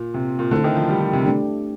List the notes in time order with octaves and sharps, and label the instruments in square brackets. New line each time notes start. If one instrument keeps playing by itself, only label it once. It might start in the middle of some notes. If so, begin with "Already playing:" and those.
Already playing: [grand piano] A#2
C3
A#2
[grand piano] D3 [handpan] A3 C4 E4 A4
[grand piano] D#3
F3
G3
F3
C3
[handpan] A3 D4 G4